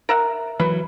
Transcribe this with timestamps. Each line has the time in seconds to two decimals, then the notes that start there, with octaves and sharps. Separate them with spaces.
0.09 A#4 E5 F#5
0.60 E3 F#3 B4